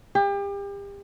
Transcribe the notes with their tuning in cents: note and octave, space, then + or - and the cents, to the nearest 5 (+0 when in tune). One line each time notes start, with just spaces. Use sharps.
G4 +35